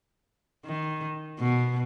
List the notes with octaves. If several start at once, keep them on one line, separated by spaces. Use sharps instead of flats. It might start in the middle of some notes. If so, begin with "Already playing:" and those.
D#3
B2